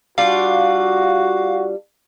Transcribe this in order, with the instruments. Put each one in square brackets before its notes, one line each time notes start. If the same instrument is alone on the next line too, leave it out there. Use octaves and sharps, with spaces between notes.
[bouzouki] G3 D4 F4 [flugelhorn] F#4 [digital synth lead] F5